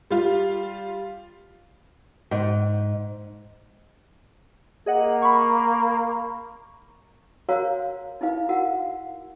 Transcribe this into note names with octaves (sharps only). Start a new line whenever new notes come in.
G3 F4
G#2
A#3 G#4 D#5 F#5
B5 C#6
F#4 A#4 C5 C#5 F5 A#5
D#4 E4 B4 F5
F#4 A#4 F5 F#5